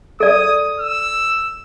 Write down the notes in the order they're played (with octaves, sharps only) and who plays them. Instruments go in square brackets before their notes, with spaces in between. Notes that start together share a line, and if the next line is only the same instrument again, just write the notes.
[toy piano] A4 D5 [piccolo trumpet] D#6
[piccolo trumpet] E6